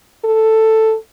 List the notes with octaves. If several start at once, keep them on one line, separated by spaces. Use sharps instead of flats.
A4